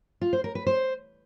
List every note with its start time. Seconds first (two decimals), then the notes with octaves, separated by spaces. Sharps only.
0.21 F4
0.33 C5
0.44 A#4
0.55 B4
0.67 C5